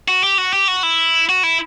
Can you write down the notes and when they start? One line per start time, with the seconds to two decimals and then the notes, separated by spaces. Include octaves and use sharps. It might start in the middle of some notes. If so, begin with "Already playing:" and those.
0.08 F#4
0.23 G4
0.38 F#4
0.53 G4
0.68 F#4
0.83 E4
1.29 F#4
1.43 E4